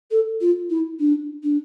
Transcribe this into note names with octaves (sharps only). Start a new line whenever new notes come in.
A4
F4
E4
D4
D4